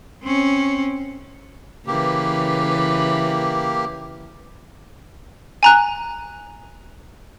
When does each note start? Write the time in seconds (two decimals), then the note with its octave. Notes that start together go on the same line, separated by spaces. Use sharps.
0.24 C4 C#4
1.87 C#3 E3 A#3 G4 B4
5.63 G#5 A#5 F#6